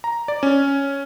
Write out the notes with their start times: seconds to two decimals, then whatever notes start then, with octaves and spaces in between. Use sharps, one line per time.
0.04 A#5
0.28 D5
0.43 C#4